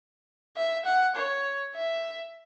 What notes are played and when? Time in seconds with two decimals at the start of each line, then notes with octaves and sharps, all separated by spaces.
0.56 E5
0.85 F#5
1.15 C#5
1.75 E5